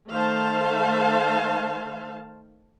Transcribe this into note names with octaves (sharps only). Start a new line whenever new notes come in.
D#3 A3 C5 F5 A5